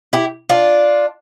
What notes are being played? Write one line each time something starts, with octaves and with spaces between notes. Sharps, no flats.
E4 G4
D4 F4